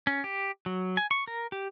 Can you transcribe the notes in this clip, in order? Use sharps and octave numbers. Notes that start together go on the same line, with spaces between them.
C#4
G4
F#3
G#5
C#6
A#4
G4